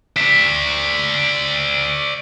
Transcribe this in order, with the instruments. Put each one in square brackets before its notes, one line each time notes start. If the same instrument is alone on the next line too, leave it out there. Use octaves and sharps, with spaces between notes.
[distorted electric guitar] D5 E5